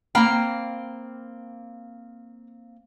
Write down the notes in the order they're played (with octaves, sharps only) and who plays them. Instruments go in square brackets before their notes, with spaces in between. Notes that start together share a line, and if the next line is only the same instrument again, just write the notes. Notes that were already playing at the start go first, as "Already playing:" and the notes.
[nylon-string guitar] A#3 C4 G5 [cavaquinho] F5 A#5 B5